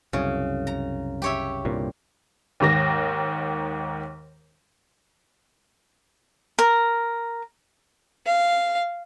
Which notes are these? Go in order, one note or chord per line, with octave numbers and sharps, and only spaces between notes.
C2 F#2 C#3
A#5
G4 C#5 E5
C2 G2 A#2
D#2 G#2 D#3 A#6
A#4
F5